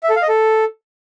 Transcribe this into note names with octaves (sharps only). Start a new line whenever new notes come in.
E5
A4
F5
D#5
A4